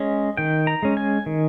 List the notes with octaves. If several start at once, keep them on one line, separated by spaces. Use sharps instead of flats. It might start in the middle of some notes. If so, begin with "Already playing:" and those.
Already playing: G#3 C#4 D#5
D#3 G5
A#5
G#3 C#4
G#5
D#3